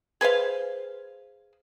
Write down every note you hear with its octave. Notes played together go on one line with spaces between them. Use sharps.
G#4 B4 C5 F5